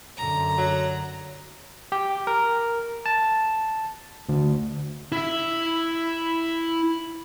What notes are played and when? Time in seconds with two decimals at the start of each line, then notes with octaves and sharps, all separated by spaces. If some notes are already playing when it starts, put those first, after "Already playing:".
0.17 F#2 D3 A#5
0.58 F#3
1.92 G4
2.27 A#4
3.06 A5
4.29 D2
5.12 E4 E5